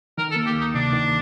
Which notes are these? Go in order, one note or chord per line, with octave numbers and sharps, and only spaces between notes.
D#3 A#4
A4
A#3
G4
D2
D#4
C3 D4
D#3